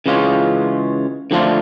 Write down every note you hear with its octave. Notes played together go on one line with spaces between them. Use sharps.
C#3 E3 G#3 C#4 F4
D3 F3 A3 D4 F4